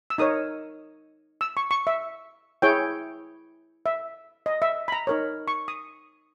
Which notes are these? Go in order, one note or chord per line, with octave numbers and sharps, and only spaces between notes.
E6
D#4 A#4 C#5 D#6
E6
C#6
C#6
E5
E4 G#4 C#5 G5
E5
D#5
E5
B5
A#5
D#4 A#4 C#5
C#6
D#6